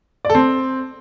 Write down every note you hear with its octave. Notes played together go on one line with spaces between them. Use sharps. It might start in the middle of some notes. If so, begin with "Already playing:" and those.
D5
A4
C4